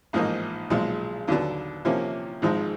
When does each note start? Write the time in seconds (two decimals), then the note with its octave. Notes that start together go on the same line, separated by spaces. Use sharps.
0.13 A1 G#2 F3 A#3 D#4
0.70 B1 A#2 F3 G#3
1.28 D#2 D3 F#3 B3 D4
1.85 C3 F3 A#3 C#4 E4
2.42 G#1 G#2 F3 G#3